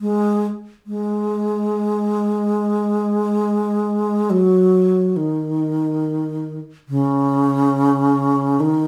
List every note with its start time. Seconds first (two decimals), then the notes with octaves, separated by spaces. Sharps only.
0.01 G#3
0.87 G#3
4.30 F#3
5.16 D#3
6.89 C#3
8.60 D#3